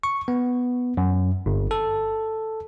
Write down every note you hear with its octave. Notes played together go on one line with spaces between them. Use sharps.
C#6
B3
F#2
G1
A4